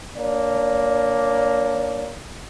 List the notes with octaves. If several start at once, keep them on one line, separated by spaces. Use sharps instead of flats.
A#3 D4 C#5 D5